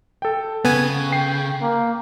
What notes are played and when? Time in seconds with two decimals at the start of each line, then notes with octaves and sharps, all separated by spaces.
0.22 A4 G5
0.65 C#3 B3 G#5
1.13 G5 C7
1.61 A#3